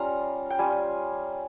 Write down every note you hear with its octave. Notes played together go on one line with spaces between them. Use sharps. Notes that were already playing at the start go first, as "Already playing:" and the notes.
Already playing: G3 C#4 F4 A#5
G5
G3 C#4 F4 G#5